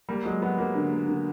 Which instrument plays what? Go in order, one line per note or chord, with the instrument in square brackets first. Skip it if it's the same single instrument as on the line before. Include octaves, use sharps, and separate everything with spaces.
[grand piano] G3 [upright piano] A#3
[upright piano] F#3 [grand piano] G#3
[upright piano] F#3 [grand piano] B3
[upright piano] F#3 [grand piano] A#3
[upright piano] D3
A#3
D3